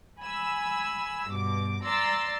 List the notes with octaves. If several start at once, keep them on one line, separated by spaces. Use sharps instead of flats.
G#5 B5 E6
G2 B2 D6
D5 A#5 C6 E6 A6